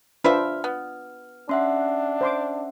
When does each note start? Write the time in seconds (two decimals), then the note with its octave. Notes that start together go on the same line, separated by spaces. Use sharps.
0.24 D4 F4 B4 C5 E5 G5 F6
0.64 B3
1.49 C#4 D4 E5 F#5 C6
2.21 C5 C6 D6